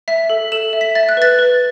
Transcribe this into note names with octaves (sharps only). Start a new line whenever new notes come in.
E5 B6
A4
A4 E7
E5
B6
E5 A6
F#6
B4 A6
B4